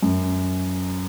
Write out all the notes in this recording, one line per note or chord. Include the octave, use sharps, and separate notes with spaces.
F#2